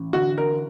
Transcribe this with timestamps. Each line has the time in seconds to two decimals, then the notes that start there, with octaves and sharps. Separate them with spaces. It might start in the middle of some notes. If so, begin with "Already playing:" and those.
Already playing: A1
0.13 D3 F#4
0.38 A#4